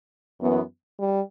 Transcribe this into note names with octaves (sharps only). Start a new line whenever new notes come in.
F#2 E3 B3
G3